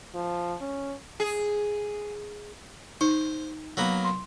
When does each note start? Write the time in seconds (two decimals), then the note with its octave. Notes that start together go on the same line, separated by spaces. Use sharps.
0.15 F3
0.61 C#4
1.20 G#4
3.01 D#4 C5
3.77 F#3 A#3 B3
4.05 C6